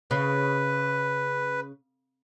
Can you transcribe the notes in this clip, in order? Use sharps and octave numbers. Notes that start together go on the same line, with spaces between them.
C#3 B4